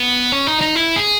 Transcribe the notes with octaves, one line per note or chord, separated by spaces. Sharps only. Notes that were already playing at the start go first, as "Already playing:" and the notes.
Already playing: B3
C#4
D#4
D#4
E4
G#4